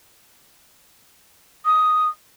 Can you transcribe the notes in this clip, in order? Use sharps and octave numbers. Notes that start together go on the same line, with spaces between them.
D#6